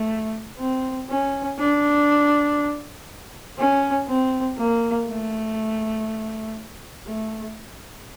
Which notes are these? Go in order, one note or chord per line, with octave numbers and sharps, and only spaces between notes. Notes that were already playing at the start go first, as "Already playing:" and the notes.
Already playing: A3
C4
C#4
D4
C#4
C4
A#3
A3
A3